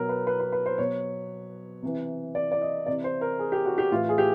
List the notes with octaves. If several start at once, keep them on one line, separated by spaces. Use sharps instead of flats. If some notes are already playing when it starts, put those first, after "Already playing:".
Already playing: B2 F#3 A#4
B4
B4
B4
B4
C5
B2 F#3 C#5
C3 E3
D5
D5
D#5
C3 E3 D5
C5
A#4
G#4
G4
F#4
G4
A2 E3 F4
G#4
G4